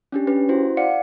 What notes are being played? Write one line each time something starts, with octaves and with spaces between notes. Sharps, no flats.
C#4 D4 G4
C#4 G4 B4
E4 F#4 C5
D5 F5 F#5 C#7